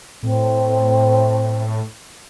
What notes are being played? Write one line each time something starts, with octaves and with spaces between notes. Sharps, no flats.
A2 C4